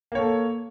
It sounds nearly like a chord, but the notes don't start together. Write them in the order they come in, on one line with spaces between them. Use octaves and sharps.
A#3 C#5 A4